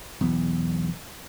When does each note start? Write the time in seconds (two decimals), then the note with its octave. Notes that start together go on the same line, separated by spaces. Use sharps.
0.21 B1 E2